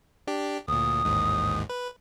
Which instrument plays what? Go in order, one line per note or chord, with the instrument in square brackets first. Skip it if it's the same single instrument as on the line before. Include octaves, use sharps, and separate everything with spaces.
[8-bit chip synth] D4 G4
[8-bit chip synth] D2 A#2 [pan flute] D#6
[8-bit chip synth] A1 D#2 G#2
B4